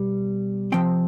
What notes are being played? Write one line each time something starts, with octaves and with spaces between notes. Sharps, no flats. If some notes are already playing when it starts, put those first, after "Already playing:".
Already playing: B2 G3
C3 F3 C4 G5